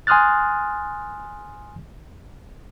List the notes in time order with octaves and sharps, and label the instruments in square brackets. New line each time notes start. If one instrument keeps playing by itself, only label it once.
[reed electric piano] G#5 C6 D#6 F6 F#6 A6